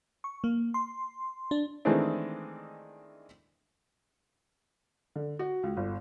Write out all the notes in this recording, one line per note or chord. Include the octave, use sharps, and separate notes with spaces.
C#6
A#3
C6
D4
D#3 E3 G#3 A3 C4 D4
D3
F#4
C#2
G1